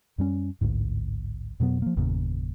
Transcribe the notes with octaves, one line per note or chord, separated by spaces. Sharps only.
F#2 G3 C#4
A1 D2 G#2
F2 B2 F#3 B3
F3 A#3
G1 E2 A#2 C#3